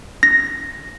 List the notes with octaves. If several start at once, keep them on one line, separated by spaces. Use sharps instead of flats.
A#6